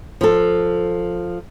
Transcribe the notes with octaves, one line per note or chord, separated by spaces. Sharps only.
F3 A4